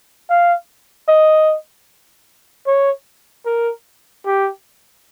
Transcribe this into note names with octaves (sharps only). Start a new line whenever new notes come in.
F5
D#5
C#5
A#4
G4